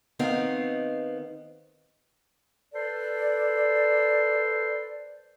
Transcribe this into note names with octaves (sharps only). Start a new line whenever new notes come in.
D#3 B3 C4 D#4 F5
A4 B4 C5 D5